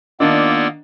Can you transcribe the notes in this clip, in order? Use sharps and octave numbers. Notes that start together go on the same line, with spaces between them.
D#3 A#3 B3 D4 F4 D5 E6